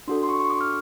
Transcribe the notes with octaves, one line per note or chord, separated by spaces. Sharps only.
D4 F#4 A4 C6
C6
C#6
C#6
D6
F6